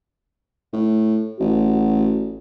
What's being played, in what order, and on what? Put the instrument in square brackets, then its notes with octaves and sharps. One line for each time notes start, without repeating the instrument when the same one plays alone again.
[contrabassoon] A2
[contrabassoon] A1 [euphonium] F#4